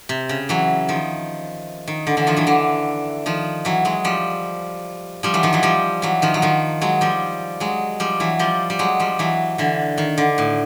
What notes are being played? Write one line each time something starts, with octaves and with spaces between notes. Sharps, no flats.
C3
C#3
E3 F#3
D#3 F3
D#3
D3
D3 E3
D#3 F3
E3 F#3
D3 E3
D#3 F3
E3 F#3
F#3 G#3
F3 G3
F3 G3
E3 F#3
D#3 F3
E3 F#3
F3 G3
E3 F#3
D#3 F3
F#3
D#3 F3
F#3 G#3
F3 G3
F#3 G#3
F3 G3
E3 F#3
F3 G3
G3
F#3 G#3
F3 G3
E3 F#3
D3 E3
D#3
D3
A2